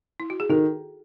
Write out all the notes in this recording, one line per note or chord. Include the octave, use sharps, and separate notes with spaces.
E4
F#4
G#4
D#3 F#4 A4